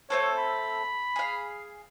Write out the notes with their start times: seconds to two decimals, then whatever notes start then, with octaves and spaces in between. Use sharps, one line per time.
0.10 A3 C4 A4 C#5
0.38 B5
1.16 G#4 F5